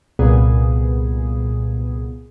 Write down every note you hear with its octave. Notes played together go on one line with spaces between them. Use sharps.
C2 A#2 B3 G#4